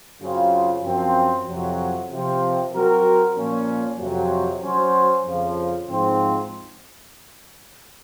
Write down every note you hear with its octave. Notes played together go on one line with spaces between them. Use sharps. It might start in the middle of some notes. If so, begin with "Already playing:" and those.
F#2 C#3 F#3 C4 F4
F#2 F3 C4
F2 C3 F#3
C3 F3 C4
F#3 C4 F#4 A#4
A#2 F3 A#3 C#4
F2 C3 F#3
F#3 C#4 F#4 C5
F2 C#3 F3
G#2 F3 C4